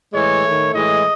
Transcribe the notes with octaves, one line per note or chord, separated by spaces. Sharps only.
A2 E3 G#3 C#5
A3
D#3
A2 E3 G#3 D#5